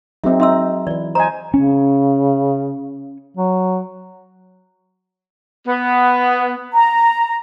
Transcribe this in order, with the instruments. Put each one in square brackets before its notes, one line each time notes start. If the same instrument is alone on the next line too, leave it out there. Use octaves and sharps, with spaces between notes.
[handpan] F#3 F#4 G#4 [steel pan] C4 D#4 [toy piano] E5
[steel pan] D#4 [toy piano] E5 C6 E6
[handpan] E3 B4 [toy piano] D5
[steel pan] C5 D#5 G#5 [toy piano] A#5
[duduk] C#3 [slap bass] C#4
[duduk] F#3
[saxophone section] B3
[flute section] A#5